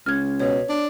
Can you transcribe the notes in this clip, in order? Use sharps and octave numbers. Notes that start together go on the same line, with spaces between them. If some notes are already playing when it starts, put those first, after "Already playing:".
C#2 F6 G#6
B2 C#5
D4